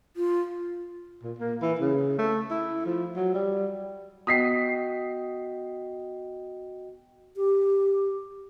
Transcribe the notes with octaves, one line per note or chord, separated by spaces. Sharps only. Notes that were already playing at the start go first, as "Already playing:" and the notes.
F4
A#2
A#3
E3
C#3
A3
E4
F3
F#3
G3
B3 F#4 D#5 G5 D#6 B6 C7
G4